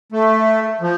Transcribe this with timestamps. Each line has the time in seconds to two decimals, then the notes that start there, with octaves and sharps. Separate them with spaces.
0.12 A3
0.81 F3